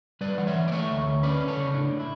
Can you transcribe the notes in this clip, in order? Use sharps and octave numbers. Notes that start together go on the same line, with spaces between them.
G3 B4 D5
E3 F#5
C#5 E5
E3
D5
A3 C#5 E5
D2
D2
C#4 B4 D5
C#4
A4 C#5
C#3
A2 D4
A2
E4